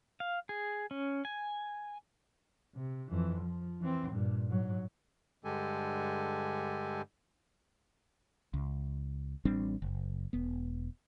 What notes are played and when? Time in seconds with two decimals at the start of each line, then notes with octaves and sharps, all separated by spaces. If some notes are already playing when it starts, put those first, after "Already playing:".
0.20 F5
0.49 G#4
0.91 C#4
1.25 G#5
2.75 C3
3.11 F2 E3
3.41 F3
3.81 E3 C4
4.12 G2 A#2
4.48 G#2 F#3
5.44 G2 D3 G#3 G4 A4 G#5
8.54 C#2
9.45 A1 G3 C4 D4
9.82 F#1
10.33 E1 B3